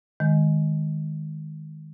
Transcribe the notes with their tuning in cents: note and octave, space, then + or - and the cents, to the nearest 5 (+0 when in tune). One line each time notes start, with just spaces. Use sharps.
D#3 +0 G#3 +0